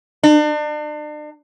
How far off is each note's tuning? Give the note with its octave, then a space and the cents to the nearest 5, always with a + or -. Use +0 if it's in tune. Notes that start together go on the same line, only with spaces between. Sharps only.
D4 +40